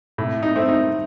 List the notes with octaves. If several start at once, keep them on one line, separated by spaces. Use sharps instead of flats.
A2
D#4
A3 C4
D#4